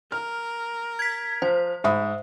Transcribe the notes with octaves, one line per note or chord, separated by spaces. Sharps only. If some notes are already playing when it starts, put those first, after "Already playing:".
A#4 F6
G#6 B6
F3 C5
G#2 E5 B5 D#6